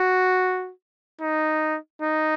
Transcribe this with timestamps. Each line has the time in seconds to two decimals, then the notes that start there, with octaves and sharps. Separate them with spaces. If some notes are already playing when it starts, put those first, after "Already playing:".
Already playing: F#4
1.21 D#4
2.02 D#4